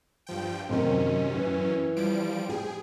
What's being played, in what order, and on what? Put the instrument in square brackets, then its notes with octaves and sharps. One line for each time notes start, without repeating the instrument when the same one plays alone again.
[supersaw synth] G2 F3 G5
[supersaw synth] F#2 C#4 [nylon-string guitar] C3 D#3 A#4
[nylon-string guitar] E3
[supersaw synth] F3 G3 D7
[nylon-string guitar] G4 [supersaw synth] G#4